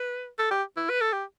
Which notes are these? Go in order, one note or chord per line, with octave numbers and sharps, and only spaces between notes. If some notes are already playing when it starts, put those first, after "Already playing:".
Already playing: B4
A4
G4
E4
B4
A4
G4